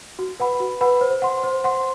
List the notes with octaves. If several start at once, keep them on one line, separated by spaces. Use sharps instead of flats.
F#4
B4 F#5 B5
F#4
B4 F#5 B5
C5
F#5 C6
C5
F#5 C6